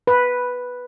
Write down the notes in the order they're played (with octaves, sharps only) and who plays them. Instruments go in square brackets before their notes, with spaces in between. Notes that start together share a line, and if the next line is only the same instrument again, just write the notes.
[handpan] B4